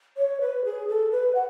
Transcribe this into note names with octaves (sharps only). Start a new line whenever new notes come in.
C#5
B4
G#4
A4
B4
F#5